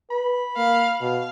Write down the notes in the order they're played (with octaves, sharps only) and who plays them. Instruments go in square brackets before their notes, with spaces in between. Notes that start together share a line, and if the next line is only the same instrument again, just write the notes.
[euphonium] B4 [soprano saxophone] B5
[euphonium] A#3 [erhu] F5
[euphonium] B2 [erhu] F5